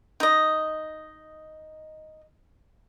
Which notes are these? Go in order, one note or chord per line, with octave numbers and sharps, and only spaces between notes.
D#4 D#5